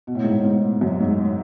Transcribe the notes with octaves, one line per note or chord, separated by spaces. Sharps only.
B2
A2
G#2
A2
G#2
F#2
G#2